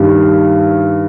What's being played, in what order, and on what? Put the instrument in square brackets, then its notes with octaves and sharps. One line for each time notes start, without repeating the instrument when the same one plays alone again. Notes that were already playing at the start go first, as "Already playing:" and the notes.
Already playing: [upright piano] G2 D#3 G3